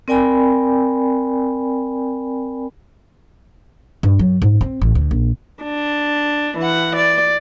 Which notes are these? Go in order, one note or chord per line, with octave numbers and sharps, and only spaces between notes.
C4 A#4 D5 G5 G#5 B5
G2
F#3
G#2
C4
A1
D2
A#1
D4
E3 F#5
D5